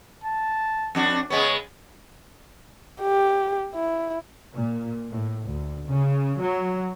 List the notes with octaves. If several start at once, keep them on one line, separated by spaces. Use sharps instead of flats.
A5
F2 D4 F#4
C#3 G#3 B3 C#5
G4
E4
A#2
A2
D2
C#3
F#3